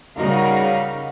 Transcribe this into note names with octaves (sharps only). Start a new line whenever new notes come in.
C#3 G3 D#4 F#4 A#4 F5